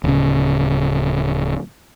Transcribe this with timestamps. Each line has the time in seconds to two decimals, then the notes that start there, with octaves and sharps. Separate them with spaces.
0.04 D1 C#3